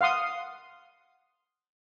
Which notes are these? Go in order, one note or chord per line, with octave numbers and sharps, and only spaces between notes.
F5 F#5 C6 D#6